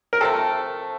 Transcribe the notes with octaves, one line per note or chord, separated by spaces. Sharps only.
A#4
C3 F3 A3 A4